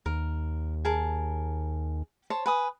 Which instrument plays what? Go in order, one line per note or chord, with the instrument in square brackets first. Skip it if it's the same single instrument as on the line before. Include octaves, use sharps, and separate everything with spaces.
[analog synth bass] D#2 [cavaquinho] A#4
[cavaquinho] G#4 A#4 A5
C5 C#5 A5
B4 G#5 D#6